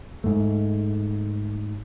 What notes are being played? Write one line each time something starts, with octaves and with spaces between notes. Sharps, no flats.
G#2 A3